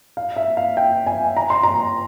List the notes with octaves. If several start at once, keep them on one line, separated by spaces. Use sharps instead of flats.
F5
E5
F5
G5
G#5
A#5
C6
A#5